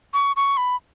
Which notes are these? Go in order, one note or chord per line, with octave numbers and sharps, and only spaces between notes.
C#6
C#6
B5